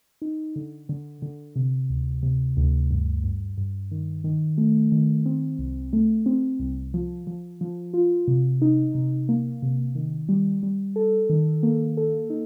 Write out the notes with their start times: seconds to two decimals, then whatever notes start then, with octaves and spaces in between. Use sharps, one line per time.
0.22 D#4
0.56 D3
0.89 D3
1.22 D3
1.56 C3
1.90 D2
2.23 C3
2.57 D2
2.90 G2
3.24 G2
3.58 G2
3.91 D#3
4.24 D#3
4.58 A3
4.92 D#3
5.25 C4
5.59 C2
5.93 A3
6.26 C4
6.60 C2
6.94 F3
7.27 F3
7.61 F3
7.94 F4
8.28 C3
8.62 D#4
8.95 C3
9.29 A#3
9.62 C3
9.95 D#3
10.29 G3
10.63 G3
10.96 A4
11.29 D#3
11.63 A#3
11.97 A4
12.30 D#4